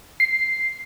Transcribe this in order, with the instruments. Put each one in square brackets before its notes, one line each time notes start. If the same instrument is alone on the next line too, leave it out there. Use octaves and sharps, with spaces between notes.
[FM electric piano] C7